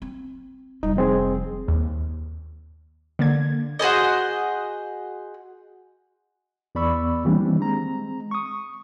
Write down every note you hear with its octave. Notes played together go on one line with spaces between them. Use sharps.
C4
F1 G3 D#4
F2 C4 G#4
D#2
D3 A#3 G#6
F#4 G#4 C5 D#5
E2 B3 D5 B5 C#6 E6
D#3 E3 G3 A#3 C4 D4
G#3 C4 A#5
C#6 D#6